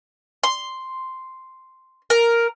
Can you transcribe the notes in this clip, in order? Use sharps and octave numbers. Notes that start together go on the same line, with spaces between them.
C6
A#4